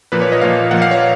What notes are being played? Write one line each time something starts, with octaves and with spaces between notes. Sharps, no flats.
A#2 F3 A#3 B4
C#5
D#5
A#2 F3 A#3 F5
A#2 F3 A#3 F#5
F5
C#5